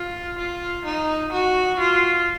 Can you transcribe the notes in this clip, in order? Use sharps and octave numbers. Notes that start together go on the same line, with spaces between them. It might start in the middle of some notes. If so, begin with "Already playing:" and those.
Already playing: F4
F4
D#4
F#4
F4